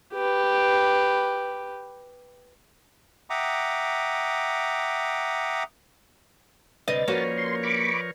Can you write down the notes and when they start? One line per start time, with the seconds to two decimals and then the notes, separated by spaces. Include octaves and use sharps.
0.14 G4 B4
3.30 E5 F#5 G5 A#5 D6 D#6
6.88 D2 C3 B4 D5 D#5 A6
7.08 F3 A#3 C#4 F#4 A#4 C#5
7.38 C6
7.63 B5 C#6 D6